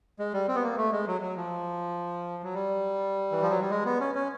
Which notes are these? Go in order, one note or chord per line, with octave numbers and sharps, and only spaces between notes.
G#3
G3
C4
B3
A#3
A3
G#3
F#3
F#3
F3
F#3
G3
E3
F3
F#3
G3
G#3
B3
C#4
C#4